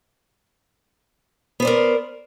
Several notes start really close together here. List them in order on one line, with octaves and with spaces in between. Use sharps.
B3 C5 D5 A#4